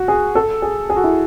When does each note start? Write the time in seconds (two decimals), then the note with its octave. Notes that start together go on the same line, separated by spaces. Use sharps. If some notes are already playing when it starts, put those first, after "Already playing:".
Already playing: F#4
0.08 G#4
0.35 A4
0.62 G#4
0.90 G#4
0.96 F#4
1.04 E4